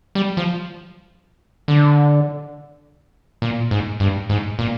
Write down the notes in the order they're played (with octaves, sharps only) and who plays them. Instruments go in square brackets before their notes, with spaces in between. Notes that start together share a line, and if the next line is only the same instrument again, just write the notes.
[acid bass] G3
F3
D3
A#2
G#2
G2
G#2
A#2